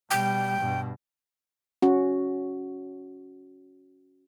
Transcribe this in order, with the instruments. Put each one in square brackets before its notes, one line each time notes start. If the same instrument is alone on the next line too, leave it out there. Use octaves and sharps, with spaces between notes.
[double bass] B2 G3 [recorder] G5
[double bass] G2 B2
[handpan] C#4 F#4